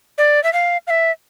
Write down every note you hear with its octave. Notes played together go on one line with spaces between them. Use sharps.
D5
E5
F5
F5
E5